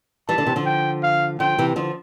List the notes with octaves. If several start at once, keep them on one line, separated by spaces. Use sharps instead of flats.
E3 G3 A5
D3
C3 E3
D3 F3
G5
F5
D3 F3 G5
C3 E3
D3 F3